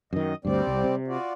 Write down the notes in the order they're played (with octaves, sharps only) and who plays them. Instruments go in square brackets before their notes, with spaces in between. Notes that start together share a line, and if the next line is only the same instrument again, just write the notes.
[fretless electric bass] F#2 D#3 [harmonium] D#5
[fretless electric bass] D2 G2 [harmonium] G3 C4 D5
[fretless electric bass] C2
C3
[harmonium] F4 F#4 D5